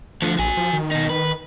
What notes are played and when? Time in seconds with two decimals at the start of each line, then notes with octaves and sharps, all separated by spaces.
0.22 D2 D3 F3
0.39 A#1 F#4 G#5
0.57 F3
0.73 D#3
0.91 B2 D#4
1.10 B4